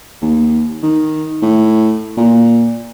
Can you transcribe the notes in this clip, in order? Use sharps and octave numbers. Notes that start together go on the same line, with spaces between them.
D#2
D#3
A2
A#2